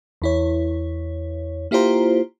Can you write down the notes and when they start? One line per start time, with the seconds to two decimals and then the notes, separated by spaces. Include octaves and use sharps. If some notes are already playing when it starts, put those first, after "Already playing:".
0.22 E2 E4 C#5
1.71 A#3 E4 F4 G4 C5 A#5